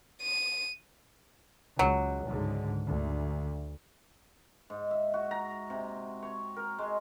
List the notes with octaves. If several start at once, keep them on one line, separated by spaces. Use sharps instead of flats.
D#7
C#2 F#3
C#2 G#2 D3
D2
G#2
E5
F#4
A#5
C3
C#5
A#4
G#3